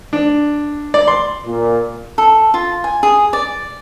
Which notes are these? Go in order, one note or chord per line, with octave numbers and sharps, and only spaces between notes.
D4
D5
C6
A#2
A4
F4
G#5
G#4
D5